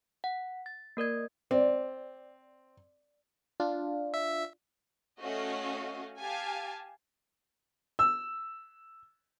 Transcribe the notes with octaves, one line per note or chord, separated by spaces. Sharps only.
F#5
A6
A#3 A#4 D5 G#6
C4 D5
D4 F4
E5
A3 C#4 F#4 D#5 F5
G4 F5 G#5 A5
E6